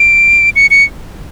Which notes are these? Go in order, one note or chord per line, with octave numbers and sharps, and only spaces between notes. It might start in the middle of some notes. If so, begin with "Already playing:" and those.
Already playing: D7
C#7
C#7